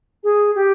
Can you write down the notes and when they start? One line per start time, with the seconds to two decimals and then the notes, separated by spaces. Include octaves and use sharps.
0.24 G#4
0.55 G4